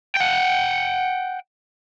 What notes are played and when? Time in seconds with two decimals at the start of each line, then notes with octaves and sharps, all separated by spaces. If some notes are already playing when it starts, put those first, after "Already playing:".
0.17 F#5 G5